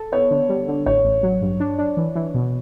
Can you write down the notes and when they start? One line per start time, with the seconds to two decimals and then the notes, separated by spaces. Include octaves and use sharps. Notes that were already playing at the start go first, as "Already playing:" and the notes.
Already playing: A4
0.12 B3 C#5
0.31 D3
0.49 G3
0.68 D3
0.86 A1 C#5
1.04 A1
1.23 F#3
1.42 G2
1.60 D4
1.79 D4
1.97 E3
2.16 E3
2.35 B2